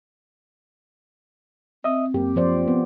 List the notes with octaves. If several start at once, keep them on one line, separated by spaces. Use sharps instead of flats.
C4 D#5 E5 D#6
F#2 A#3 G4
F3 C5 D5
B3